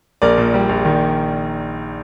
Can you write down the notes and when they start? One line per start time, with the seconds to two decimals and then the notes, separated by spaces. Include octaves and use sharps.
0.22 A#1 A#4 D5
0.38 A#2
0.54 G3
0.69 A#1
0.85 D#3